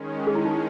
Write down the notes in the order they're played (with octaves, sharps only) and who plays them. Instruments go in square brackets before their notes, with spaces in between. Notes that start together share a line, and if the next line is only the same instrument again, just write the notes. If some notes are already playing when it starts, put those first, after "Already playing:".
Already playing: [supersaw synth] D#3 G#3 C#4
[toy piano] G#4
E4
D#4
E4